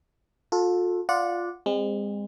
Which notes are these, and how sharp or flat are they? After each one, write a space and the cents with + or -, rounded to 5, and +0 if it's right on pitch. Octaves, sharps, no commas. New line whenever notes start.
F4 +40 A4 +0
F4 +0 D5 +0 F#5 -20
G#3 -35 C4 +0